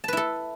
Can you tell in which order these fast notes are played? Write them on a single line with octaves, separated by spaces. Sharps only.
A5 B4 E4 A4